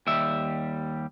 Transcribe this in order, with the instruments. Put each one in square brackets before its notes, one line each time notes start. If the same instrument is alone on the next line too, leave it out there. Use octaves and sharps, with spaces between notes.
[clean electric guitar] D#2 G3 E5